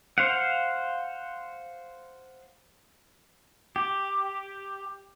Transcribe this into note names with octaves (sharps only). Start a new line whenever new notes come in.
C5 F5 F#5
G4